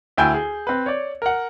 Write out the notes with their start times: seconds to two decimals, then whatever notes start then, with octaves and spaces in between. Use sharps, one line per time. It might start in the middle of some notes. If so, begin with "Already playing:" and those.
0.18 D2 E4 G5 G#5 G6
0.34 G#4
0.67 C4 B4
0.86 C#5 D5
1.22 A#4 F#5